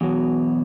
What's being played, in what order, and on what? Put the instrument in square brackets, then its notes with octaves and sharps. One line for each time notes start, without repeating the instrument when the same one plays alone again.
[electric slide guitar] E2 B2 F#3